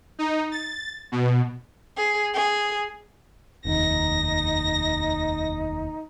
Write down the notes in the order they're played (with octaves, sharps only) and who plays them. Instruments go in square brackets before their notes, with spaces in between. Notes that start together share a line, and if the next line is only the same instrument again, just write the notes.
[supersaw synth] D#4
A6
B2
[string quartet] G#4
G#4
[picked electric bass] F1 D#2 [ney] D#4 [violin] A#6